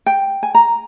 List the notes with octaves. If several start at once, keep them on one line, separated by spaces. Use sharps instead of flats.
G5
G#5
A#5